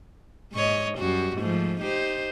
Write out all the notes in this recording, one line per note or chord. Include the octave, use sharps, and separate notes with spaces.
G#2 C#5 D#5
F#2 G3 F#4
G#2 F3 A3
D#4 G4 C5